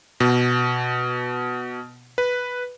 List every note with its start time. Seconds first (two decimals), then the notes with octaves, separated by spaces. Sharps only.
0.20 B2
2.18 B4